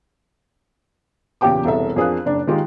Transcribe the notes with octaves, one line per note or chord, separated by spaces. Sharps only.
E2 A#2 C#3 G4 G5 D6
E1 C2 A4 E5
F2 D4 G#4 A#4 F5 F#6
F#1 D4
D#3 G#3 F4 G4